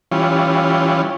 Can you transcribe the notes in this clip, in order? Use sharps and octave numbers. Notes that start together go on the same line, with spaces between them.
E3 G3 C#4 F4